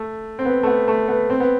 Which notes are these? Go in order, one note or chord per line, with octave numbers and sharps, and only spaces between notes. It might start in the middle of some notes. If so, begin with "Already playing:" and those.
Already playing: A3
C4
B3
A3
B3
A3
B3
C4
B3